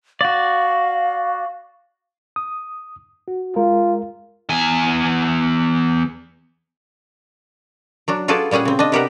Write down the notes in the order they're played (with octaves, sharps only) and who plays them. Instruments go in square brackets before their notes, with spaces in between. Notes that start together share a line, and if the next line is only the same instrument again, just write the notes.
[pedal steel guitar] F#4 D5 [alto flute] F5
[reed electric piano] D#6
F#4
[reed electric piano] G#3 A#4 [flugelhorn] F4
[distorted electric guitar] E2 G#5
[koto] F#3 D4 F#4
F4 F#4 G#4 A4 B4 D5
A#2 G3 C#4 G#4 F#5
C#3 C4
D4 D#5
C3 B3 G4 A#4 E5 F#5